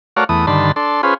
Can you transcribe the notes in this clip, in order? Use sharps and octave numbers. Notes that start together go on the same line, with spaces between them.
A3 F#4 A#4 C#5 D5 F5
E2 A3 B3 D#6
G2 D3 D#3 A5 B5 C6
D4 A4 C6
C#4 F4 G#4 B4 C5